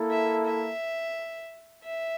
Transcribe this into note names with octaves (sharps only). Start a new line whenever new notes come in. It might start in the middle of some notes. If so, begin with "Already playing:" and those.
Already playing: A#3 E4 A4
E5
E5
E5